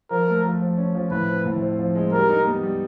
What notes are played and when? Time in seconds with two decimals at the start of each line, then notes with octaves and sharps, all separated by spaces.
0.11 F3 A#4
0.27 A3
0.44 F3
0.61 F3
0.77 C#4
0.95 F3
1.11 A2 B4
1.29 C4
1.46 A2
1.62 C4
1.79 F3
1.95 G#3
2.12 G3 A#4
2.29 D#4
2.46 B3
2.63 G3